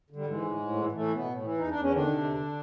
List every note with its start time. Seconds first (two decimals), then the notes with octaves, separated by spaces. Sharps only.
0.10 D3
0.16 G3
0.26 G#2 E3 G#3
0.42 A2
0.59 A2
0.76 E3
0.92 A2 E3 A3
1.08 A2
1.13 B2 B3
1.25 A2
1.41 E3
1.57 E2 D#4
1.69 E2 D4
1.81 C#4
1.91 D3 D#3 D4
2.07 C3
2.23 E2